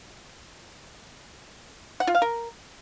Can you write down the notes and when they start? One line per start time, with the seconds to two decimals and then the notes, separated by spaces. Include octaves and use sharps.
2.00 F#5
2.07 F4
2.15 F5
2.22 A#4